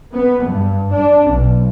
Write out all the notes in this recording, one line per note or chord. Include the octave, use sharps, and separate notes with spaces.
B3
G2
D4
B1